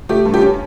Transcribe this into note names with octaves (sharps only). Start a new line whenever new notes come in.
A3 G4
G2
G4
C#4